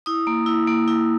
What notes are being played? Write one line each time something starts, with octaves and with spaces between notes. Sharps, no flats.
E4 D#6
A#3
E4
A#3
E4